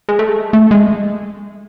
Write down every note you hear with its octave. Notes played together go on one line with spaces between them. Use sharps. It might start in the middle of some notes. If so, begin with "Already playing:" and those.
G#3
A3
G#3
A3
G#3